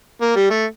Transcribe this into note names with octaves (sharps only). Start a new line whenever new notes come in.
A#3
G3
A3